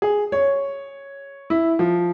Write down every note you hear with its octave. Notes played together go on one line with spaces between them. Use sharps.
G#4
C#5
E4
F3